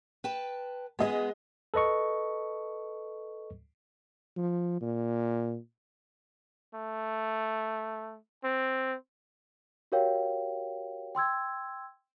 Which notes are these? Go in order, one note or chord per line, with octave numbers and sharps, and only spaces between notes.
B4 G5 A5
G#3 B3 G#4 D#5
A4 B4 D#5 C#6
F3
A#2
A3
C4
F#4 G4 A#4 C#5 F5 G5
G5 C6 E6 G#6